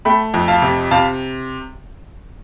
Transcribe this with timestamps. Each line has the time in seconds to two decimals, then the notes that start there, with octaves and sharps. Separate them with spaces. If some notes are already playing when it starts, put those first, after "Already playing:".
0.05 A3 G5 B5
0.34 F2
0.48 F5 A5
0.62 C3
0.91 C3 F5 A5